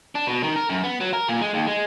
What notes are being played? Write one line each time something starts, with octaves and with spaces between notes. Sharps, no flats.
D4
B2
D#3
A#4
F#2
B3
F#3
A#4
A#2
G#3
D#2
G#3